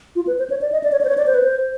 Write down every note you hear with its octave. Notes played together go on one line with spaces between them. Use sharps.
F4
B4
C5
C#5
D5
D#5
D5
C#5
D5
C5
C#5
D5
C5
B4
C5